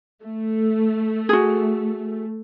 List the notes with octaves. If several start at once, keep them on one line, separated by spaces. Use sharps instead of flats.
A3
F#4 G#4